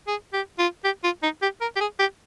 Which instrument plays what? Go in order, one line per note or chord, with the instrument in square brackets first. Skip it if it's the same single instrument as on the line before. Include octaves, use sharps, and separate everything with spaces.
[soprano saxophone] G#4
G4
F4
G4
F4
D#4
G4
A#4
G4
G#4
G4